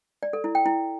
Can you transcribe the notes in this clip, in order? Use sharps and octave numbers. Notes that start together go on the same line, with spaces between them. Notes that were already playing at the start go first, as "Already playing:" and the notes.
D5
A4
E4
G5
E4